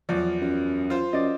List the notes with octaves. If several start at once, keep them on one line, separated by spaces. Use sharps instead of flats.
E2 F3 F#3 D5
F#2
F4 C5
F#2 D5 D#5